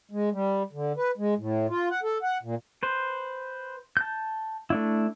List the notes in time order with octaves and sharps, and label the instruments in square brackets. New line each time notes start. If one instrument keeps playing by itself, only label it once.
[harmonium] G#3
G3
D3
B4
G#3
A2
F4
F#5
A4
F#5
A#2
[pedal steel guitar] B4 C5
A5 G6
A3 D4 E4